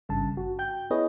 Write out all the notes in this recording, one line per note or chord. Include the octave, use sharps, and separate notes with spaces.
G#1 G2 C#3 A5
F#4
G5 G6
B3 E4 G#4 B4 C#5 D#5